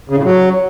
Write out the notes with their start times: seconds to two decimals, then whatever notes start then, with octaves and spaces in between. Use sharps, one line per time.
0.10 C#3
0.17 A2
0.24 F#3